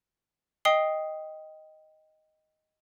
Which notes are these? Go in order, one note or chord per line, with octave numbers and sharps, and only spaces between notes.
D#5 G5 D#6 C7 G7